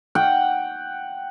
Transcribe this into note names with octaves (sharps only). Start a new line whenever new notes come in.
F#5 G5